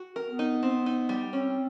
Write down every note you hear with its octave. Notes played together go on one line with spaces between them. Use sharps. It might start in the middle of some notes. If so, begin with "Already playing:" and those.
Already playing: F#4
A#4
B3
D#4
C4
D#4
G3
C4 C#4